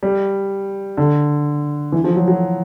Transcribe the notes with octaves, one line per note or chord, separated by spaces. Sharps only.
G3
D3
E3
F3
F#3
F#3